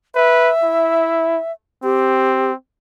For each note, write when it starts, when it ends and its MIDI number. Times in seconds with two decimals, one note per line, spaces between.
0.15 0.50 71
0.15 1.52 76
0.63 1.39 64
1.84 2.54 60
1.84 2.51 67